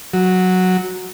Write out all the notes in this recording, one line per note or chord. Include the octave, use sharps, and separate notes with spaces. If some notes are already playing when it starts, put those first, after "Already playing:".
F#3